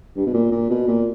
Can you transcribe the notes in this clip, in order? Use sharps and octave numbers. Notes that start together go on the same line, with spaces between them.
G2
B2
A#2
A#2
B2
A#2